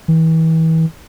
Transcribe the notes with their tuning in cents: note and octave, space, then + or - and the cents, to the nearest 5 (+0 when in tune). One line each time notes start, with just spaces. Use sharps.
E3 -35